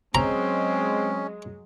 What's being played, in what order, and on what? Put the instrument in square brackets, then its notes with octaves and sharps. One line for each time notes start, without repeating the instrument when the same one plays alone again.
[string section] F#3 G#3 [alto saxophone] C4 [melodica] C#4 [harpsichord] A#5